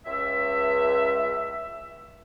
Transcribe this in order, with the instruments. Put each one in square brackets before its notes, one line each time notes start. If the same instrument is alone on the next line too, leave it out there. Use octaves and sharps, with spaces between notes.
[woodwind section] C#2 E5